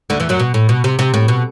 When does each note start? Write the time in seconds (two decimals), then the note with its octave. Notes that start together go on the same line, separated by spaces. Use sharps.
0.10 D2 D3
0.20 E2 E3
0.29 F#2 F#3
0.40 B2
0.54 A2
0.69 B2
0.84 C3
0.99 C3
1.14 A2
1.28 B2